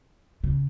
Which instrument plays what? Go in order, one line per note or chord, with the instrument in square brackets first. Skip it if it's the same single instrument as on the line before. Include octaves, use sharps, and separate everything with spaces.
[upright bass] C#3